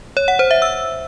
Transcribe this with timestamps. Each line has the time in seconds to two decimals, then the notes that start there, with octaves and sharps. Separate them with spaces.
0.17 C#5
0.28 F#5
0.39 C5
0.51 E5
0.62 E6